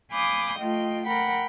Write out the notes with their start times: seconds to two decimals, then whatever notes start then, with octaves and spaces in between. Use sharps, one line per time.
0.11 F5 G#5 B5 D6 D#6 G6
0.60 A3 F4 D#5 G5
1.06 A#4 F#5 G5 B5